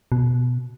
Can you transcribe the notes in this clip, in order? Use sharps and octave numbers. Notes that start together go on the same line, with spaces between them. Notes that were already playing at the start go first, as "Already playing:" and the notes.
B2